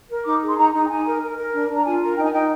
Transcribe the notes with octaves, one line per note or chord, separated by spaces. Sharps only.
A#4
D#4 D6
G#4
C6
D#4 A#5
D#4
G5
D#4 G#5
A#4
A#4
A#4
D4
D4
A#5
F4 G#5
A#4
D#4 G5
G#5
D#4 G5